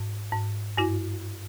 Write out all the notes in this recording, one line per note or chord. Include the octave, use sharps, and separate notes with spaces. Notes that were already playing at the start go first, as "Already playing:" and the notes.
Already playing: G#2
G#2
G2 E4 F#4